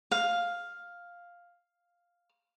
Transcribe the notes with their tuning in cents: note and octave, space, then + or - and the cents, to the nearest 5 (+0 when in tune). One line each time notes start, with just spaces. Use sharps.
F5 +5